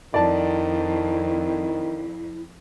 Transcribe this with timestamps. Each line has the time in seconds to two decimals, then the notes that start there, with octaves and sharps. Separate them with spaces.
0.14 F2 D#3 E4 D5 A5